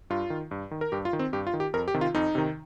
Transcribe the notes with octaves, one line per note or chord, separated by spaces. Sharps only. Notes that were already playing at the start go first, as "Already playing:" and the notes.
G2 F4
D#3
G2
D#3
A#4
G2 G4
F4
D#3
C4
G2 G4
F4
D#3
G4
F2 A#4
G4
C3 D#3
F4
F2 D#4
C3 D#3